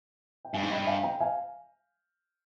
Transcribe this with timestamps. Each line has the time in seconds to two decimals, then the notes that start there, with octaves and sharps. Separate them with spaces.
0.45 G5
0.53 G2 F5 G#5
0.62 G#2
0.70 G2 D#5 G5
0.87 F5 G#5
1.03 G5 A#5
1.20 F5 G#5